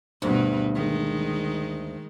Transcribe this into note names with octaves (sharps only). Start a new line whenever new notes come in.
D2 G2 B2 B4
D#3 G#3